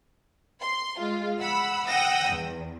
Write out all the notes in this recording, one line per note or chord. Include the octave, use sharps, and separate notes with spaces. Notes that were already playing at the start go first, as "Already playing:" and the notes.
C6
G#3 F4
F#5 B5 E6
F#5 G5 D#6 E6 A#6
E2